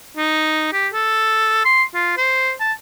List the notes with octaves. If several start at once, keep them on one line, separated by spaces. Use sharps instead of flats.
D#4
G4
A4
C6
F4
C5
A5